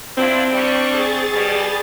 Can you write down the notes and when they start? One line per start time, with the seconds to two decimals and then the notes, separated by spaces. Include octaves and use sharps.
0.17 C4 D4 E4 F4
0.52 G3 D4 C#6
0.91 G#4 A6
1.33 B2 G3